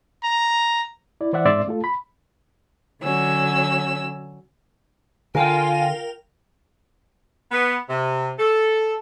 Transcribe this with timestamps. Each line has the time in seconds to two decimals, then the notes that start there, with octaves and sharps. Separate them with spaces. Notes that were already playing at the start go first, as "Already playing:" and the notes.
0.24 A#5
1.21 E4 D5
1.33 E3 C5 D5 E5 F#5
1.45 G#2 C4 D5 E5 C6 E6
1.68 A3 F4 A4
1.84 B5
3.02 D3 F#3 C#4 E6
5.35 D3 F4 A#4 F5 G5 G#5
7.51 B3
7.88 C3
8.38 A4